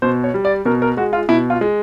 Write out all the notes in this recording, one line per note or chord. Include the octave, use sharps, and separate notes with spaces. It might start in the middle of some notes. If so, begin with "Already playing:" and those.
B2 C5
C#5
G3
D5
B2 A#4
A#4
G#3 F#4
F4
B2 E4
F4
G#3